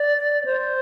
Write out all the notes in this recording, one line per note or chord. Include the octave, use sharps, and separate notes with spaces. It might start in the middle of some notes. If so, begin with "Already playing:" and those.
Already playing: D5
C5